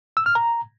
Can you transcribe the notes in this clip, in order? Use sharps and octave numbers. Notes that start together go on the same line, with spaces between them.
E6
F6
A#5